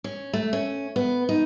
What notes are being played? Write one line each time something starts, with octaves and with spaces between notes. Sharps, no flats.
C#4
A3
C#4
B3
D#4